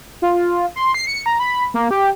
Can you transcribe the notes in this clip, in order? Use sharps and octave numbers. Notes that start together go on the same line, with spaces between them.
F4
C6
C7
C#7
A#5
B5
A#3
G4